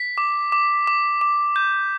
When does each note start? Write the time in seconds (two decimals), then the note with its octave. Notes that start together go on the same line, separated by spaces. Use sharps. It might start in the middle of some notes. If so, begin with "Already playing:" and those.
Already playing: B6
0.18 D6
0.52 D6
0.87 D6
1.21 D6
1.56 G6